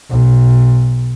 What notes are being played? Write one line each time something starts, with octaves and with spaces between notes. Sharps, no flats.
B1